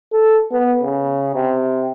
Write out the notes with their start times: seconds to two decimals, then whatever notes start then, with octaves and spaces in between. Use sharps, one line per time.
0.12 A4
0.52 B3
0.83 C#3
1.35 C3